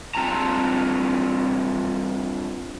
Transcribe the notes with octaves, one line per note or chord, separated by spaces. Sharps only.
G2 C4 F4 A5 A#5